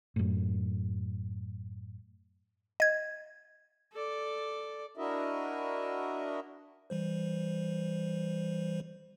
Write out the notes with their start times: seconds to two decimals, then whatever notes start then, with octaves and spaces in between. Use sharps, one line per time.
0.16 F#2 A2
2.80 D#5 G#6
3.93 A4 D5
4.97 D4 E4 F#4 A#4 D#5 E5
6.90 E3 G3 C5